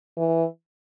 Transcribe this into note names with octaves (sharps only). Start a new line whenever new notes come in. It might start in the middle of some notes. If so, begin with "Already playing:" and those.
E3